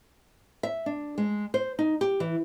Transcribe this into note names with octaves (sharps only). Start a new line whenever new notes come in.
E5
D4
G#3
C5
D#4
G4
E3